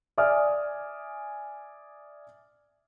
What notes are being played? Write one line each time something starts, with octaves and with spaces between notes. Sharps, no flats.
D5 E5 G#5 D#6 F6